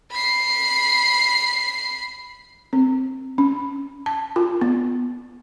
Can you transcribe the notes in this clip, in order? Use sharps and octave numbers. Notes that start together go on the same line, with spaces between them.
B5 C7
C4
C#4
A5
F4
B3